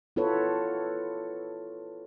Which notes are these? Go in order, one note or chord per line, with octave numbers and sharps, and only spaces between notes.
B3 E4 F4 A4 B4 C#5